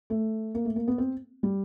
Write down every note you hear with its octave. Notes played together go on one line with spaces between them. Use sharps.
A3
A#3
A3
A#3
B3
C4
G3